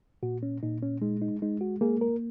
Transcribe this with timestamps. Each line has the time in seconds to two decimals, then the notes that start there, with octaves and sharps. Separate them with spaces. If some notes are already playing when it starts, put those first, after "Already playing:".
0.23 A#2 F#4
0.43 C#4
0.63 A#2 D#4
0.83 C#4
1.02 G#3 D#4
1.22 D#4
1.42 G#3 D#4
1.61 F#4
1.81 A#3 G#4
2.01 A#4